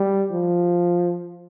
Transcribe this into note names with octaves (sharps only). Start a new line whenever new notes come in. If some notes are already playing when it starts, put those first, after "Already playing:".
Already playing: G3
F3